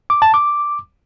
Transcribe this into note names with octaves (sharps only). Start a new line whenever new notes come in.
D6
A5
D6